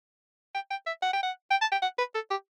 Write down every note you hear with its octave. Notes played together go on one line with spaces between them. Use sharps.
G5
G5
E5
F#5
G5
F#5
G5
A5
G5
F#5
B4
A4
G4